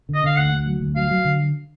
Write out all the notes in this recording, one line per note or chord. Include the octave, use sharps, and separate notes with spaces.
D3
D#5
D3 F5
D2 F#5
D2
F#3
D2
F#3 F5
F#3
D3